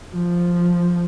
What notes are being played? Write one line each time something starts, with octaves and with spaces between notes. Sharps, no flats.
F3